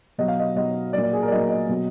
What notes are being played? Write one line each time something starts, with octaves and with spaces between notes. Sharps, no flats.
B2 F#3 D#5
F5
D#5
B2 F#3 D#5
A#2 F#3 D5
D5
G#4
A#4
D5
A#2 F#3 D#5
D#5
B2 F#3